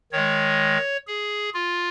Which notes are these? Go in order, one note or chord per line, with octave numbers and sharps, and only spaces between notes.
D#3 G#3 C#5
G#4
F4